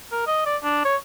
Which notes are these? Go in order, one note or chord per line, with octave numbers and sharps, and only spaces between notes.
A#4
D#5
D5
D4
C#5